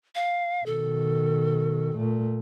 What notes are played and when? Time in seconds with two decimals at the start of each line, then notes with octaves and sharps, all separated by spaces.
0.15 F5
0.66 B2 D#3 A4
1.98 A#2 A3